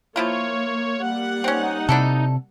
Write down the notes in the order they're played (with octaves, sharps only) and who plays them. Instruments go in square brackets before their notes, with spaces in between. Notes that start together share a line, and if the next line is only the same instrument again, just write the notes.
[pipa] F3 E4 F4 [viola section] A#3 [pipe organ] C#5
[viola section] G3 A#3 F#5
[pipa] C4 C#4 [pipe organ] D#4
[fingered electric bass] C3 [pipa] D4 E4 A4